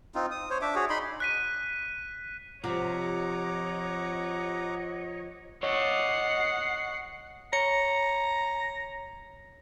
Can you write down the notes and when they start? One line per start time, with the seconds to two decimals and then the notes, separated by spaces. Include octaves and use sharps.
0.15 C4 D#4 F4
0.31 D#6
0.50 C5 C#5
0.62 D4 E5 D6
0.75 F#4 G#4 C#5
0.90 D#4 B5 C6
1.20 F#6 B6 D#7
2.64 C3 F3 C#5 D#5 F#5 A#5 D6
5.63 C#5 D#5 F#5 C7
7.53 C#5 A#5 C#7